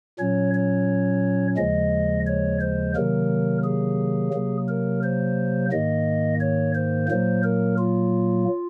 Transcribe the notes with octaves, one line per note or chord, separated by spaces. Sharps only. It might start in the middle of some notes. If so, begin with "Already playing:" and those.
A#2 F#3 C#4 C#5
C#5
D#2 C#3 F3 G#3 D#5
C#5
C5
C3 D#3 F#3 A#3 A#4
G#4
C3 F#3 A#3
A#4
C5
G#2 D#3 A#3 D#5
C#5
C5
A#2 F#3 A#3 C5
A#4
F4